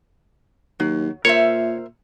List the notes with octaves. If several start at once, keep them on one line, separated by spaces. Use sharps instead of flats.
D#2 F#3
A#2 A#4 C5 C#5 E5